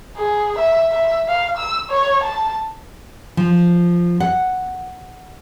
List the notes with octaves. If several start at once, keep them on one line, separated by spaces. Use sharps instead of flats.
G#4
E5
E5
F5
E6
C#5
A5
F3
F#5